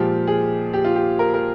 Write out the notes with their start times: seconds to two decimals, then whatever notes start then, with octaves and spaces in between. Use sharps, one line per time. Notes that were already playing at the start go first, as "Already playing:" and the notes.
Already playing: A#2 F3 G#3 G4
0.27 G#4
0.73 G4
0.84 F4
0.95 G4
1.19 A#4
1.34 A#4